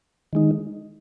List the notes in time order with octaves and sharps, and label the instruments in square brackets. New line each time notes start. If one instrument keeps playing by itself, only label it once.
[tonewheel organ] D#3 G#3 D#4